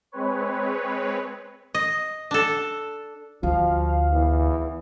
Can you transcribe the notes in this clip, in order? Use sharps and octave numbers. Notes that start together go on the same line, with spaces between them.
G#3 C4 B4 C#5
D#5
D4 A4
D2 F3 F5
E2